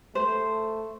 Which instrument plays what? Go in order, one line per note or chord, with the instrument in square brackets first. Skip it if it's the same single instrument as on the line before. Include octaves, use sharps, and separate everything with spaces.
[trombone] A3 [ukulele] C5